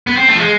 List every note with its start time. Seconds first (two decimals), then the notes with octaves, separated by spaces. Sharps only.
0.07 B3
0.17 C4
0.28 A3
0.36 F3
0.40 G#3